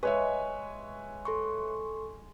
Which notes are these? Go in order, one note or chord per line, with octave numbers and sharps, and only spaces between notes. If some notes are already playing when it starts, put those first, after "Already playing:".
G#3 B4 C#5 E5 C#6
A4 C6 C#6